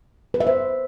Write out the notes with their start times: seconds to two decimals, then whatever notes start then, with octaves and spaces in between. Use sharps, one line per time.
0.34 B4
0.40 E5
0.47 C5